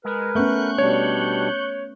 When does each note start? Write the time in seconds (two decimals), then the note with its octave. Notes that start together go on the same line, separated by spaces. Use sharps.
0.05 G#3 A#4 B4
0.35 A3 B3 C#4 C#6 F#6 G6
0.78 B2 G3 D4 C#5